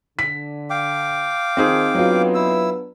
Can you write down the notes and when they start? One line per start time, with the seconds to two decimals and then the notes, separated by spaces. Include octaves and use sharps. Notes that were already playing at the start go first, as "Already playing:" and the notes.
0.19 D3 B6
0.70 F5 G5 D6
1.57 D#3 F3 C4 D#4 G#4
1.95 F#3 B3 D4 F4 B4
2.35 E4 E6